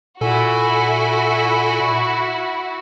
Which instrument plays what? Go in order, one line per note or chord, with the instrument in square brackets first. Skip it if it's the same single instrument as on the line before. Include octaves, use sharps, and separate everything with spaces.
[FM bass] A#2 [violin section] E4 F#4 [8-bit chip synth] A4 G#5